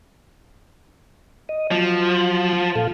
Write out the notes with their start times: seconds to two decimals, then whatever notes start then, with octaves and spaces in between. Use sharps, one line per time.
1.49 D#5
1.71 F3 F#3
2.76 A#2 A4 F5